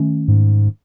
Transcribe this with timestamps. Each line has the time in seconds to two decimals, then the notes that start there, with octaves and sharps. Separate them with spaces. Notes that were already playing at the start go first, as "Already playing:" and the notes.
Already playing: D#3 A3 C#4
0.28 G#2